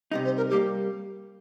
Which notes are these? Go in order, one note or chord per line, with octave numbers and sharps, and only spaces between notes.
C3 G3 D#4 D#5
C5
A#4
G3 A#3 G4